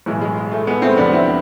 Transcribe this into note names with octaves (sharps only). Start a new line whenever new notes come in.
B1 A2 E3 G#3
G#3
G#3
A3
G#3 B3
A3 C4
F1 F2 C3 F3 B3 D4
C4 E4